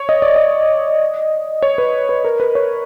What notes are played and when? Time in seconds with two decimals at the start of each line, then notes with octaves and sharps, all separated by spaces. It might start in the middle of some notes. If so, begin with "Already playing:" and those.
Already playing: C#5
0.09 D#5
0.22 D5
0.36 D#5
1.63 C#5
1.78 B4
2.09 B4
2.25 A#4
2.40 B4
2.55 C#5